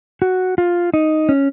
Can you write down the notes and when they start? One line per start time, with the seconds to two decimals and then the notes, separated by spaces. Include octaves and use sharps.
0.22 F#4
0.58 F4
0.94 D#4
1.29 C#4